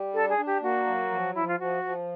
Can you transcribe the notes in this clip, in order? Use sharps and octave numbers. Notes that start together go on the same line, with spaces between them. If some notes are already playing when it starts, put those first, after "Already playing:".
Already playing: G3
D4 A4
G#4
D4
G4
A#3 F#4
F#3
F3
F3 E4
F4
F3 F#4
F3